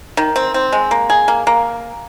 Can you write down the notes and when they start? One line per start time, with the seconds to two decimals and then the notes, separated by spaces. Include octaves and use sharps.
0.17 D#3
0.36 C4
0.54 C4
0.72 G#3
0.91 A#3
1.10 G#4
1.28 A#3
1.47 A#3